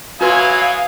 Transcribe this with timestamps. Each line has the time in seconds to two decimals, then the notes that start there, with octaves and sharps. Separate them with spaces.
0.21 F#3 E4 F#4 B4 F5 G#5 C6 D#6